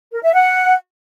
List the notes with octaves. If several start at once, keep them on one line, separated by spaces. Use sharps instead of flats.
A#4
E5
F#5